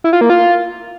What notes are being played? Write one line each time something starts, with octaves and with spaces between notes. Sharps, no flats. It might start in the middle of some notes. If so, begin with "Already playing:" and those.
E4
F4
A#3
F4